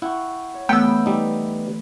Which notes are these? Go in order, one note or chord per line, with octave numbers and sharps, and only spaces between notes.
E4 F#5 G5 C#6
C#5
E3 A3 B3 G5 E6
G3 D#4